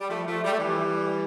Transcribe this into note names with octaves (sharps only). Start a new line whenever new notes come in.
G3
F3 A3
F3 A3
G3
A3
E3 G3